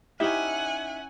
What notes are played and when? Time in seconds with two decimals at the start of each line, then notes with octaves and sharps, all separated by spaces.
0.20 C#4 D#4 E4 G4 E5 F#5 G#5